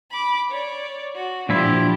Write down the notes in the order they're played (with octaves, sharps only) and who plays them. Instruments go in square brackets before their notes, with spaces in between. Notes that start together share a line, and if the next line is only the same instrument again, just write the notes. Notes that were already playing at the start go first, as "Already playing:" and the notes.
[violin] B5 D6
C#5 D5
F#4
[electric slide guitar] A#2 F3 E4 [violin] D4 G4